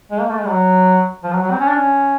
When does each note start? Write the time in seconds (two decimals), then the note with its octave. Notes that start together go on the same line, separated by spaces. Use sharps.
0.11 G#3
0.21 A#3
0.30 A3
0.39 G#3
0.44 G3
0.49 F#3
1.24 F3
1.33 F#3
1.43 F#3
1.51 C4
1.60 C#4
1.68 D4
1.76 C#4